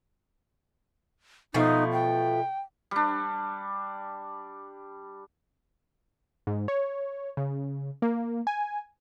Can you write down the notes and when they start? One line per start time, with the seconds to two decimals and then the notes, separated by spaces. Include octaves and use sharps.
1.54 B2 F3 A3 D#4
1.92 G5
2.91 G3 D4
6.47 G#2
6.68 C#5
7.37 C#3
8.02 A#3
8.47 G#5